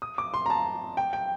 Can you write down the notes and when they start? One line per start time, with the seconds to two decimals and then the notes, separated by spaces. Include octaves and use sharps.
0.02 D#6
0.18 D6
0.34 C6
0.46 A#5
0.50 A5
0.97 G5
1.13 G5